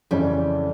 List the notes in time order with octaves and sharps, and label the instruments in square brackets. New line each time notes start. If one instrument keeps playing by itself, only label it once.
[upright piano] F2 C#3 E3 G#3 C#4 [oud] G3